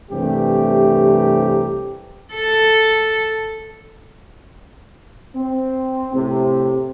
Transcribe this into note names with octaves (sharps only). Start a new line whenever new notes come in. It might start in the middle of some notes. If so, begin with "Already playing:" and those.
C2 G2 C3 E3 A3 G4
A4
C4
A2 C3